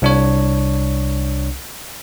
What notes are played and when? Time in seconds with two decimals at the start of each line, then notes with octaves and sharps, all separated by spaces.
0.02 C2 D4 C#5